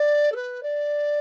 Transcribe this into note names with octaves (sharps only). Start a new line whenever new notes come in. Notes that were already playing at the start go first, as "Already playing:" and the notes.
Already playing: D5
A4
B4
D5